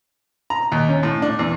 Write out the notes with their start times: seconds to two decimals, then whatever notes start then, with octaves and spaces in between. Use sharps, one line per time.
0.50 A#5
0.72 D#2
0.89 C#4
1.03 A2
1.22 D4
1.39 E2